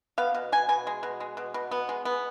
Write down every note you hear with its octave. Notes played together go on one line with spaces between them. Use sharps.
B3 F5
B2
B2 G#5
B2 G#5
G#3
B2
G#3
B2
B2
B3
G#3
B3